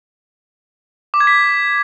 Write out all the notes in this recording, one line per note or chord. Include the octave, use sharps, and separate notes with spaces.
D6
G#6
B6